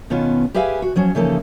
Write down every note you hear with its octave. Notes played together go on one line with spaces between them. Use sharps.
B2 D#3 B3 C#4 F4
G4 G#4 B4 E5 F5 G#5
F#4
F3 F#3 C#4
C#3 E3 F3 A#3 D#4 A4